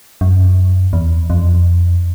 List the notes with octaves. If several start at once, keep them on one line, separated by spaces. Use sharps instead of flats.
F#2
E2
F2